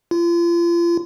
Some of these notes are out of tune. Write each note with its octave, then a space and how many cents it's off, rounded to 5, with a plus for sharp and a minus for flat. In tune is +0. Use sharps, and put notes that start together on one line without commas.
F4 -35